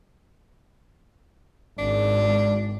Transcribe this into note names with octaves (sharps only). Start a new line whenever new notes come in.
G#1 D4